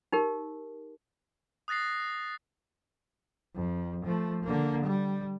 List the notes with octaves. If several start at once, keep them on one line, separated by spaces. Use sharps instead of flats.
D#4 G4 A#4
D#6 F#6 A6 A#6 C7
F2
F3 A3
D3 A#3
G3